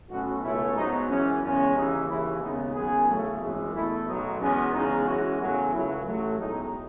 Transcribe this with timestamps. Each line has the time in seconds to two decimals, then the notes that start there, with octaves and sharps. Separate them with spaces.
0.10 B1 B2 A3 C#4 F#4
0.42 C#2 B2 A3 C#4 E4
0.76 G#2 F#3 B3 D#4
1.09 F#2 E3 G#3 C#4
1.42 E2 C#3 G#3 C#4
1.75 D#2 C#3 E3 D#4
2.08 D#2 C#3 E3 G#3 E4
2.42 D#2 C#3 G#3 B3 D#4
2.74 F#2 D#3 G#3 B3 G#4
3.07 E2 C#3 F#3 A3
3.41 G#1 F#2 E3 G#3
3.74 E2 B2 A3 E4
4.07 B1 B2 F#3 A3 D#4
4.40 E2 B2 G#3 B3 C#4
4.73 E2 C#3 G#3 C#4 D#4
5.06 F#2 E3 G#3 C#4 F#4
5.39 E2 C#3 F#3 A3 C#4 F#4
5.72 C#2 C#3 F#3 A3 E4
6.05 A1 A2 F#3 A3
6.38 B1 A2 G#3 D#4